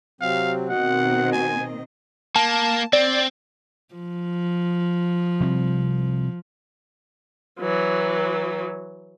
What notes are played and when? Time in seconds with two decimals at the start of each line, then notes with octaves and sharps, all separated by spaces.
0.21 C3 F#3 C4 F5
0.69 B2 D#3 C4 F#4 D#5 F#5
1.33 G#5
2.36 A#3 A5
2.93 C4 D5
3.95 F3
5.40 C3 G3 C4
7.60 E3 F#3